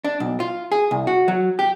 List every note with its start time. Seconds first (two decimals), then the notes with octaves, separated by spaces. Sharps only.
0.04 D4
0.20 B1
0.40 F4
0.72 G#4
0.91 C2
1.07 F#4
1.28 F#3
1.59 G4